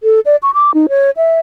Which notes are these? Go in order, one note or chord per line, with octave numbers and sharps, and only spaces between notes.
A4
D5
C#6
D6
D#4
C#5
E5